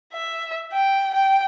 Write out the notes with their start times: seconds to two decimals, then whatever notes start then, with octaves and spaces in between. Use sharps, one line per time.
0.13 E5
0.72 G5
1.14 G5